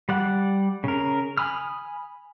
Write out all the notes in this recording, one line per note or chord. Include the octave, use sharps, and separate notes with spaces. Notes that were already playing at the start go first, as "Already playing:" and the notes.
G3 D5 F#5
C#3 A#4
G#5 B5 D#6 F6